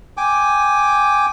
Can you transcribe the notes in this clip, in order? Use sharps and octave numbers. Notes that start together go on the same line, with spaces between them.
G5 G#5 D6